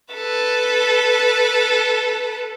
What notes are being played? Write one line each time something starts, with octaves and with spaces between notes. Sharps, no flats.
A4 B4